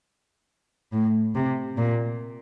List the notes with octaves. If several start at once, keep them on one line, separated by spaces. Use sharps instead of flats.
A2
C3
A#2